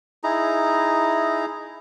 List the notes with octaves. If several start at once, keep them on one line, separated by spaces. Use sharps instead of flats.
D#4 E4 G#4 A#5